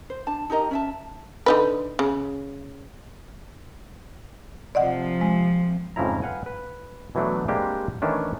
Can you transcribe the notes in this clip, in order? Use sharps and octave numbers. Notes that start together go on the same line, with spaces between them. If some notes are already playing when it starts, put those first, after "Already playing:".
C5
D4 A5
D#4 G4 A#4 D#5
C#4 E5 A5
D3 D#4 B4
C#3
C3 F3 D5 D#5 F#5
G#3
F2 G#2 C#3 F3 E4 A#5
B4 F5 F#5 G#5
B4
B2 E3 F#3 A3 D4
G3 G#3 A#3 C4 D4 G4
D#3 E3 A3 C#4 D4